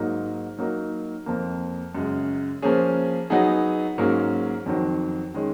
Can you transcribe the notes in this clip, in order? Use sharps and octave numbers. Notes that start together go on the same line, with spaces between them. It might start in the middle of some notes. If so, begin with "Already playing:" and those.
Already playing: G#2 F#3 A#3 D#4
F#3 A#3 D#4 A#4
F2 F3 A#3
F#2 C#3 G#3
F3 A#3 C#4 G#4
F#3 B3 D#4 G#4
G#2 F#3 A#3 C#4 G#4
F2 D#3 F#3
D#3 G#3 C#4